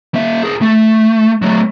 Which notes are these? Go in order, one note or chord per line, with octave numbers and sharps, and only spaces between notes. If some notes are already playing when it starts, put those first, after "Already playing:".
A#3 E5
G#4 A#4
A3
F#3 A3